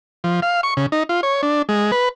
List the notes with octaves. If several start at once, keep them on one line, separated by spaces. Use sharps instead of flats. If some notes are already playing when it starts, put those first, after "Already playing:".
F3
F5
C#6
C#3
D#4
F4
C#5
D4
G#3
B4